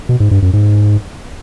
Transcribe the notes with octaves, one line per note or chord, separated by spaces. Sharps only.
B2
G#2
G2
F#2
G#2